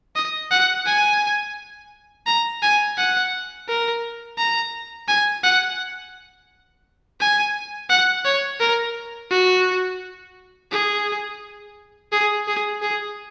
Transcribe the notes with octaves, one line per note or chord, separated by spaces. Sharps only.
D#5
F#5
G#5
A#5
G#5
F#5
A#4
A#5
G#5
F#5
G#5
F#5
C#5
A#4
F#4
G#4
G#4
G#4
G#4